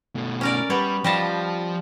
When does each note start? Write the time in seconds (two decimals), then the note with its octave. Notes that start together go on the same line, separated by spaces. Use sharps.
0.16 B2 A3
0.41 C#4 A#4 D5
0.70 G3 B3 C#5
1.04 F3 G3 F4 D#5 A5